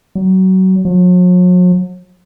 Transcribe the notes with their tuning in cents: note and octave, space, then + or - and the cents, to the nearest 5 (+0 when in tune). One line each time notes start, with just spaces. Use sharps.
F#3 +25
F#3 -45